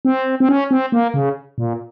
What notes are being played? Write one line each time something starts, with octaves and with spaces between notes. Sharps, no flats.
C4
C4
C#4
C4
A#3
C#3
A#2